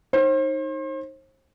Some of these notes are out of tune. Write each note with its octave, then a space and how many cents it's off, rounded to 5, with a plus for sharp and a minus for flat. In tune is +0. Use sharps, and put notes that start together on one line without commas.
D#4 +0 C5 +40